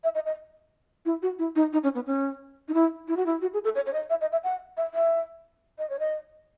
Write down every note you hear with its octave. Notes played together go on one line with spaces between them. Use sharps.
E5
D#5
D#5
E4
F#4
E4
D#4
D#4
C#4
B3
C#4
D#4
E4
E4
F#4
E4
F#4
G#4
A4
C#5
C#5
D#5
E5
D#5
E5
F#5
E5
E5
D#5
C#5
D#5